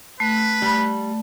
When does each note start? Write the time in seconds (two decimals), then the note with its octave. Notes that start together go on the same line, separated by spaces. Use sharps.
0.20 A3 B4
0.62 G3